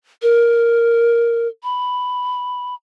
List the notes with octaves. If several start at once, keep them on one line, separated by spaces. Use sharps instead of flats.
A#4
B5